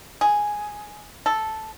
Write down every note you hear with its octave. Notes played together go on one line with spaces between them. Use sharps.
G#4
A4